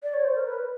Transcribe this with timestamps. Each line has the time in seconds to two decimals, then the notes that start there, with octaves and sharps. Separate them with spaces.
0.03 D5
0.14 C#5
0.24 C5
0.35 A#4
0.47 B4